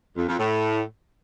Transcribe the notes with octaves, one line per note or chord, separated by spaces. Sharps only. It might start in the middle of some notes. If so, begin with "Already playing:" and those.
F2
F2
A2